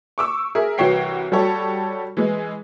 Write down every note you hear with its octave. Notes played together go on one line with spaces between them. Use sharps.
C#6 D6 E6
G#4 A#4 E5
C2 E3 F#4 C#5 G5 C7
G3 F#4 G4 A4 C#5
E3 G#3